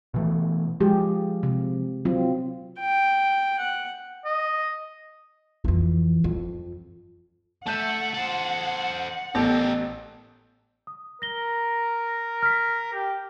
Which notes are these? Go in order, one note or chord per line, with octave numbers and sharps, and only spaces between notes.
B2 E3 A3
F3 G#3 G4 G#4
C3
F#3 C4 F4
G5
F#5
D#5
F2 E3
F2
A3 E5 F#5 A5 G6 D#7
A4 C5
A1 B3 G4 A4 A#4
D#6
A#4 A#6 G7
F6 B6
G4